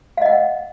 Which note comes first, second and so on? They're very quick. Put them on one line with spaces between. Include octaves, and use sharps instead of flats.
F5 D#5 F#5